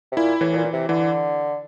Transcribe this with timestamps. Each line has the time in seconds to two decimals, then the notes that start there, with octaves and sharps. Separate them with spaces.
0.12 C3
0.16 A#2 E4
0.41 A2 E3
0.52 A2
0.57 A#2
0.65 E3
0.73 C3
0.89 D3 E3